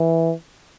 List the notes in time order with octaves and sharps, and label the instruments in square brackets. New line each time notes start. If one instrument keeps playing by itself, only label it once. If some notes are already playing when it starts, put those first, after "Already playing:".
Already playing: [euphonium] E3